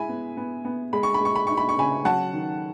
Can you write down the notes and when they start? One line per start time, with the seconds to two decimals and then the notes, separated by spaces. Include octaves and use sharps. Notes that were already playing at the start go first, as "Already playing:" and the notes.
Already playing: G#3 E4 G#5 B5
0.09 B3
0.37 B3
0.65 B3
0.93 G#3 B5
1.03 C#6
1.14 B5
1.20 G#3 C#6
1.36 B5
1.47 D#4 C#6
1.57 B5
1.69 C#6
1.77 C#3 G#5 B5
2.05 F#3 F#5 A5
2.33 D#3